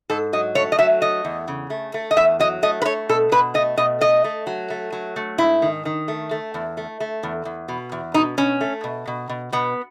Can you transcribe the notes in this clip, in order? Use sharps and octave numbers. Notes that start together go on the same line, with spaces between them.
G#2 A4
F#3 D#5
A3 C#5
D#5
F#3 E5
A3 D#5
E2
C#3
A3
A3
D#5
E2 E5
F#3 D#5
A3 D#5
B4
A3 C#5
B2 A4
B2 B4
A3 D#5
B2 D#5
A3 D#5
A3
F#3
A3
F#3
A3
G#2 E4
D#3
D#3
A3
A3
E2
A3
A3
E2
E2
B2
E2
B2 D#4
B2 C#4
A3
B2
B2
B2
B2 B3